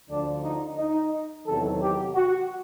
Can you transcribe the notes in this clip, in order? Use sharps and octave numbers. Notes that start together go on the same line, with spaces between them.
D2 D3 F3 D4
D#4
D#4
E2 C3 D#3 F#3 A4
G4
F#4